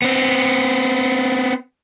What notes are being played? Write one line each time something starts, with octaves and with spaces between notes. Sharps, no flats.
B3 C4